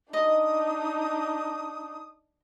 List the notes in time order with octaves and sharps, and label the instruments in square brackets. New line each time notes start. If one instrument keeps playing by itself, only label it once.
[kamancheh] D4 D#4 [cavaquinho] D#5 [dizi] D#6